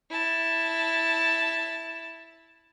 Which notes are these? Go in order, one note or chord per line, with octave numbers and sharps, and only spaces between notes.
E4 A5